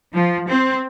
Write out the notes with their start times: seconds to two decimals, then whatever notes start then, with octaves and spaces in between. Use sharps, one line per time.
0.14 F3
0.50 C4